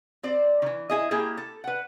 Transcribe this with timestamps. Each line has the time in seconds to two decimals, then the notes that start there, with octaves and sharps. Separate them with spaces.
0.23 C4 C5 D5
0.62 D#3 E3
0.90 E4 G#4 D#5
1.11 A#3 E4 G4 G#4 A#4
1.37 A4
1.64 B4 F#5